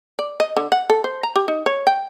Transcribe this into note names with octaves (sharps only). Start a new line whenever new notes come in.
D5
D#5
D3
F#5
A4
C5
A#5
G4
D#4
C#5
G5